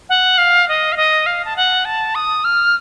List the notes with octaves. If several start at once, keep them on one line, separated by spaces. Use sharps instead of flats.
F#5
F5
D#5
F5
D#5
F5
A5
F#5
A5
D#6
F6